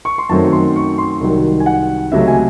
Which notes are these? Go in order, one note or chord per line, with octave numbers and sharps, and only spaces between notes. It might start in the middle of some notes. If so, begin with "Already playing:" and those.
C#6
C6
F#2 D#3 F#3 A3 C4 A5
C6
C#6
C6
C2 C3 D#3 F#3
G#5
F#5
C#2 C3 F#3 A3 E5
G#5